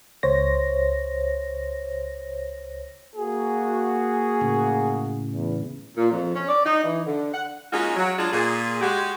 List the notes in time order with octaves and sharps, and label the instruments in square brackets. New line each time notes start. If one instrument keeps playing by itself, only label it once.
[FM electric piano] C#2 C5 C#5 A#6
[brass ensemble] A#3 F#4 [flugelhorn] G#4
[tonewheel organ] A2 C#3
[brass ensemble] E2
[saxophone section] A#2
F2
C#4
D5
D#4
E3
D3
F#5
G#3 A#3 C#4 D#4 F4 F#4
F#3
F#3 G#3 D4 D#4 F4 G#4
A#2 G#4
G#3 F#4 G4